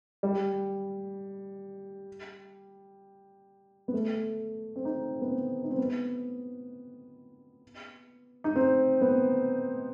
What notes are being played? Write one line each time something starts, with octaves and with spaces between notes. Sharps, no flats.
G3
B3
A3
C4
D#4
B3
C4
D#4
C4
B3
D#4
C4
B3